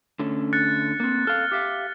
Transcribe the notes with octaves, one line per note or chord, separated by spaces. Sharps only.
D3 A3 C#4
F#6 A6 C#7
A#3 C4
A4 F5 F6
G4 E5 F5